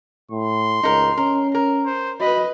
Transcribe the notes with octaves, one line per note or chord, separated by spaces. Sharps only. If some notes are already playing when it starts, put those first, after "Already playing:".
A2 C6
C#2 D#4 A#4
C#4 A#4
A#4
C5
F#4 B4 D#5 B5